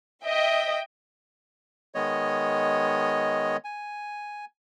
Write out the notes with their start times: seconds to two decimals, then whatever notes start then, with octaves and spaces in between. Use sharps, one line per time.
0.24 D#5 E5 G5
1.95 D#3 G#3 B3 C#5 D#5
3.65 G#5